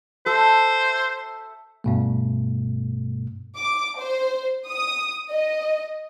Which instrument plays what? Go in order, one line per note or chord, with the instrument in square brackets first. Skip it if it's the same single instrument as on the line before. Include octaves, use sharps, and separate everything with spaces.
[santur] A4 E5 [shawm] C5
[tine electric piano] G2 B2 A3
[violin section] D6
C5
D#6
D#5